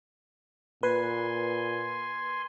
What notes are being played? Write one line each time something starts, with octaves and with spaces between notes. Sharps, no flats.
A#2 B4 G#5 C6